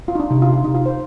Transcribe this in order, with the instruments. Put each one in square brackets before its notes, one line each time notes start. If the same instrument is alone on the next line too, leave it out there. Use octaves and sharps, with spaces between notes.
[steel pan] F4
D#4
D4
[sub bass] C3 [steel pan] D#4
[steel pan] F4
G4
D#4
F4
C5